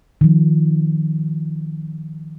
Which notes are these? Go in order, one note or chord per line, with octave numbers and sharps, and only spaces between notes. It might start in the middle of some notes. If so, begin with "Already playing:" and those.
D#3 F3